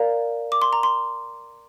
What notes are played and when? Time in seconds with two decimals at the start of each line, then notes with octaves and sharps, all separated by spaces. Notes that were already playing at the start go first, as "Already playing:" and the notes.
Already playing: A#4 D5 F5 A#5
0.52 D6
0.62 C6
0.73 A#5
0.83 C6